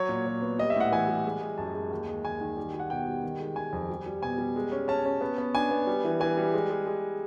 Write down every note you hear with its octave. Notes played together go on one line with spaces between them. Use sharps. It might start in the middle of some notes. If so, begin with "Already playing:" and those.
Already playing: F#3 C#5
A#2
F#3
B3
G3 D#5
E5
A2 F#5
E3 G#5
G3
G#3
G#3
F#2 A5
G#3
D#2
G#3
D#2 G#5
D#3
G3
G3
F#5
B2 G5
G3
D#3
G#3
D#3 G#5
F2
G3
G3
B2 G#5
G3
G#3
C#4
C#4 A5
C#4
B3
B3
D4 G#5
B3
G3
E3
E3 G#5
G3
G#3
G#3
G#3